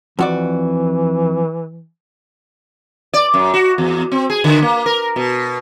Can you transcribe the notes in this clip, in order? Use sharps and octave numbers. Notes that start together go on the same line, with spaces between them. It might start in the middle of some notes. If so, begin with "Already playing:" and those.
F2 E3 F#4 D5
D5
F#2
F#4
E2
C4
G#4
D3
A#3
A#4
B2